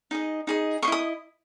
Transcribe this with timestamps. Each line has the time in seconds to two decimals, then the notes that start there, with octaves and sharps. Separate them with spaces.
0.11 D#4 G#4 D#5
0.47 D#4 G#4 D#5
0.82 C5 D#5 C#6
0.88 E4 D#6